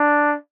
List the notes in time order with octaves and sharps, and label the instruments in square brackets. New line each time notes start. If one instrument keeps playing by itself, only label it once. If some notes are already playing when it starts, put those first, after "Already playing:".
Already playing: [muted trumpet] D4